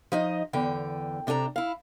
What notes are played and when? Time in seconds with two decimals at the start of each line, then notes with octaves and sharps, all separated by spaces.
0.12 F3 D#4 D#5
0.53 E2 D3 G5
1.27 C3 D4 A4 G#5 A#5
1.56 E4 F5